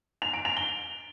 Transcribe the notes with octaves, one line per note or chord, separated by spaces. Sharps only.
F7
D7
F7
G7